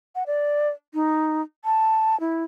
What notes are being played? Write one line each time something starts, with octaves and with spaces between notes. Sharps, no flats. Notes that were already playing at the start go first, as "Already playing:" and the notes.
F#5
D5
D#4
A5
E4